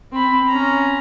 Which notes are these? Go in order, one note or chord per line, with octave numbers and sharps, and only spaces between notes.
C4 B5
C#4 A#5